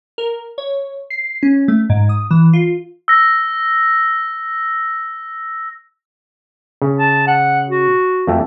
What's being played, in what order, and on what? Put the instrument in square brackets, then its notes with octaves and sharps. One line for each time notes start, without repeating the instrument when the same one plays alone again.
[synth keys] A#4
C#5
C7
C#4
A3
G#2
D#6
E3
F4
[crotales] E6 A#6
[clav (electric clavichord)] C#3
[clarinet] A5
F#5
F#4
[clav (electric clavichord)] F2 A3